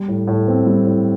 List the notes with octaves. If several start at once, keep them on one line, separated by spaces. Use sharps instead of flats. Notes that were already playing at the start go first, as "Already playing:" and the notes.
Already playing: G3
A2
A2
C4
G3
A2